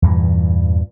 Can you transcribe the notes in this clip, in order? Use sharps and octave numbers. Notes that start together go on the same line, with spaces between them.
E2 G2 A#2 E3